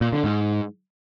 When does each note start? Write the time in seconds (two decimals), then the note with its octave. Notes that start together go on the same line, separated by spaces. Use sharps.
0.01 A#2
0.13 D3
0.24 G#2